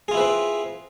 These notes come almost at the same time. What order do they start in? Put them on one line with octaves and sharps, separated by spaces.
G#4 F4 E4 B4 C4